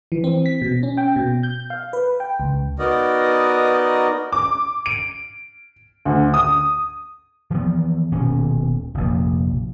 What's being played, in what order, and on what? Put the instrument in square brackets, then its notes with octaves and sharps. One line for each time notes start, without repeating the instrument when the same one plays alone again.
[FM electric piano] E3
C4
B6
B2
C#4
G5
B2
G6
F5
B4
G5
C#2
[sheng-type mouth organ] B3 D#4 F#4 A#4 D5 D#5
[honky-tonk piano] D6
D7
D2
D#6
[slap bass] E3 F3 B3
D#1 B2 C#4
F1 A#1